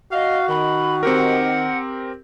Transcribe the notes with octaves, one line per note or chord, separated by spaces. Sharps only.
F#4 D#5 F5
D#3 B5
C4 G4 A#4 F#5